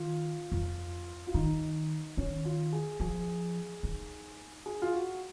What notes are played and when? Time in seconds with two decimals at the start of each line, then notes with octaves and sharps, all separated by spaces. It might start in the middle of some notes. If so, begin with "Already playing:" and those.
Already playing: D#3 F4
0.52 F2
1.27 F4
1.34 D#3 D#4
2.17 D#3 C#4
2.45 F4
2.73 G#4
3.00 F3 G#4
3.83 D#4
4.66 G#4
4.82 F4
4.93 F#4